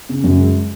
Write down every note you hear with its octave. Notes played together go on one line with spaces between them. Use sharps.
C#3
F#2
G#3